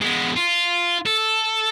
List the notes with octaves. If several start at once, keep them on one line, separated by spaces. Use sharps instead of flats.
G#3 B3
F4
A4